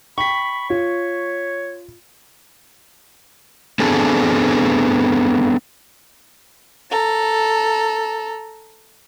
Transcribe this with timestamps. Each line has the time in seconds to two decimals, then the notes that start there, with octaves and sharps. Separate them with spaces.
0.18 G5 B5 C#6 B6
0.70 F4 C#5
3.80 B3 C4 D4 G#4 A4
6.90 A4 A#5